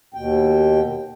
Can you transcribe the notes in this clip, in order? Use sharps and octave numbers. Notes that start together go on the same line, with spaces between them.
D#2 B2 G5